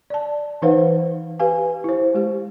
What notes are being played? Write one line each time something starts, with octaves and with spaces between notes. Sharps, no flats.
D5 A5
E3 D#4 B4 C5 F5 F#5
G4 B4 F5 G#5
E4 C5
G#3 G4